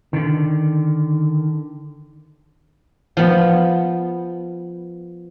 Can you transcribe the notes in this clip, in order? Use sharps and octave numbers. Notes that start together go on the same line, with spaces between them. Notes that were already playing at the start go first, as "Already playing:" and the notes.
D3 D#3
F3 B3